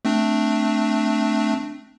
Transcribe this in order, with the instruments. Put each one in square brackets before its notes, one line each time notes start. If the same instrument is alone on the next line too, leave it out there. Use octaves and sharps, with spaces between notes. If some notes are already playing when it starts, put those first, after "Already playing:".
[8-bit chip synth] A3 C4 D4